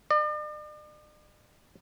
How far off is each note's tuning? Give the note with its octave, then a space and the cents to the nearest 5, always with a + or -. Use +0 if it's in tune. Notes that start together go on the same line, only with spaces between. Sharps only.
D5 +45